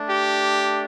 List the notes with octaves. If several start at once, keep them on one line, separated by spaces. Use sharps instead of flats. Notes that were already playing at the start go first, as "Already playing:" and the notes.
Already playing: A3 D4
G4